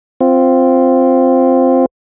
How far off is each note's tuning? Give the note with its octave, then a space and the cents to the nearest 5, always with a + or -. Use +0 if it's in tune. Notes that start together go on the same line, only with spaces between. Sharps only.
C4 +0 F4 +0